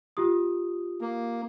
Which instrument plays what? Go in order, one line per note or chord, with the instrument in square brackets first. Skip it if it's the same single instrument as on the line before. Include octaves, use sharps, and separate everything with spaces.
[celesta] F4 G4 D#6
[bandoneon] A#3